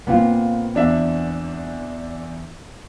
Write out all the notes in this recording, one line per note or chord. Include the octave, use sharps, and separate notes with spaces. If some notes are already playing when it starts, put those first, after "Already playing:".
A#2 B3 C4 F4
E2 D4 E5